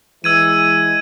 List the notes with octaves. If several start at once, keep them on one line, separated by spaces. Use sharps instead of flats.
E3 G#3 E6 G#6 D#7